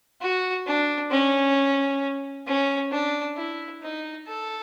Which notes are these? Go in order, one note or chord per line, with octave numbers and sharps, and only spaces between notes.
F#4
D4
C#4
C#4
D4
E4
D#4
A4